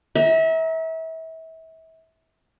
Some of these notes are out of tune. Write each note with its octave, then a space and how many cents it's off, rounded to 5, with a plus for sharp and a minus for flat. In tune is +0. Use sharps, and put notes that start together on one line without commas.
E5 -30 A#5 +20